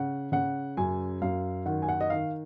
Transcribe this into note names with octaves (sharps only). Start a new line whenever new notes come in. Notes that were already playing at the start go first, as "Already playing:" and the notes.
Already playing: C#3 F#5
C#3 F#5
F#2 G#5
F#2 F5
D#3 F#5
G#5
F#5
D#5
D#3 F5